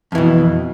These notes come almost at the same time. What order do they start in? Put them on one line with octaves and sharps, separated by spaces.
F2 E3 B2